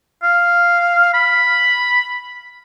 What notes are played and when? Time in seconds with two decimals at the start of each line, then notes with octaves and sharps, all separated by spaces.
0.23 F5
1.14 B5